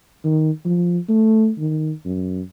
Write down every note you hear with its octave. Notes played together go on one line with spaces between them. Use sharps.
D#3
F3
A3
D#3
F#2